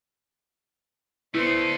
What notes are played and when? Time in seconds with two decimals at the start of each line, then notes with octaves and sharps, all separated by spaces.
1.35 A3 B3 D4 E4 C5